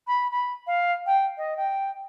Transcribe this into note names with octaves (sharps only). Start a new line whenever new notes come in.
B5
B5
F5
G5
D#5
G5